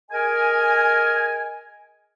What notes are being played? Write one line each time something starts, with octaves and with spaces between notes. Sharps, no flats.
G#4 A#4 D#5 G#5